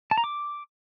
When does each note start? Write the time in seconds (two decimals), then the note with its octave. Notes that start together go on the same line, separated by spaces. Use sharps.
0.11 A5
0.18 A#5
0.24 D6